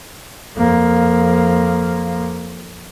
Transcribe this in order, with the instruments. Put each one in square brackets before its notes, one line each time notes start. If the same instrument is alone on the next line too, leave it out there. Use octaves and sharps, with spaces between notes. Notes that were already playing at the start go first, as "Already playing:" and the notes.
[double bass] F2 A#3